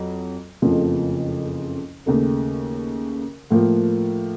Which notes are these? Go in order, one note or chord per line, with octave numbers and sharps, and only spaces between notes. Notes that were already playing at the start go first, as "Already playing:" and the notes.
Already playing: F2 F#3
F#1 F2 C#3 F3 A3
D#2 C#3 A3
A2 F3 A#3